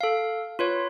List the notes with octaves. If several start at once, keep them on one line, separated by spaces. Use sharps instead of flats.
A4 F5
F4 B4 C#5